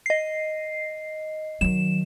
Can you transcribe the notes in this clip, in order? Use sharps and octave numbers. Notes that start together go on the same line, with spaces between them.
D#5 C7
D#3 F#3 E7